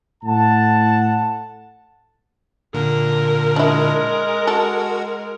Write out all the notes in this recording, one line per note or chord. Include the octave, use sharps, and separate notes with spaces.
A2 F#5 A5
A#2 D3 A#4
G#3 D4 E4
F#4 A4